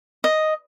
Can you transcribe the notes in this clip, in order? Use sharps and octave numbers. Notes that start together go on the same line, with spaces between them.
D#5